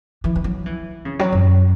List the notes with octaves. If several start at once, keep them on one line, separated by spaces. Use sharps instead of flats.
E3
E3
F#3
E3
C#3
F#3
F#2